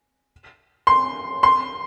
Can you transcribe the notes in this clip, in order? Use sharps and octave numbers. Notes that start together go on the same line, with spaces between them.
C6
C6